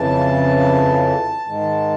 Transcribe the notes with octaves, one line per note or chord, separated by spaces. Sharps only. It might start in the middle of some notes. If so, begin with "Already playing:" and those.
Already playing: F2 C#3 E3 A5
G#2 D#3 G#3 A5